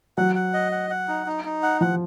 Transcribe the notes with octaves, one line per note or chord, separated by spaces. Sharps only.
F#3 F#5
F#5
D#5
F#5
F#5
D#4
D#4
D#4
F#5
F3 F#5